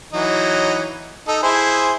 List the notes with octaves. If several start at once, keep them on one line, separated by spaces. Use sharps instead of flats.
E3 F#3 D#4
D#4 A4
E4 G#4 C5